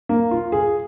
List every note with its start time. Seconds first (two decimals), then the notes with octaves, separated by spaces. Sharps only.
0.09 A#3
0.31 F4
0.52 G#4